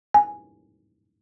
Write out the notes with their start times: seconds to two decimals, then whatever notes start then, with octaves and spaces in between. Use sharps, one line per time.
0.14 G#5